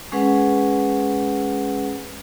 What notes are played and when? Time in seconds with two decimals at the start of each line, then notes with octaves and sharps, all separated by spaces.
0.12 G#3 C#4 G#4 B4 F#5